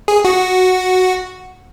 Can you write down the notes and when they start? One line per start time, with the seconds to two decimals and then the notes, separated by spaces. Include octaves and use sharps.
0.08 G#4
0.25 F#4